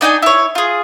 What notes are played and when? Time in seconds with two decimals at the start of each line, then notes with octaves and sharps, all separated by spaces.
0.01 D4 D#4 G5 G#5
0.22 E4 C#5
0.55 F4 G#4